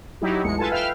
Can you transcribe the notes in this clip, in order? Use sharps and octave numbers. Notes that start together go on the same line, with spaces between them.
F#3 D#4 E4 G4
A1 E2 G#3 C#7
F4 A4 B4 G#5 A5
B4 E5 F5 G5 F6